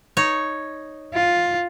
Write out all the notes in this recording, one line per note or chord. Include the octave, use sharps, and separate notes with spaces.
D#4 C#5
F4